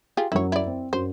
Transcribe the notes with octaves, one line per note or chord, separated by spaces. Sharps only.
F4 G4 G#4
F#2 F#3 E4 C#5
E4 D5
C4
F#2 F#4 C5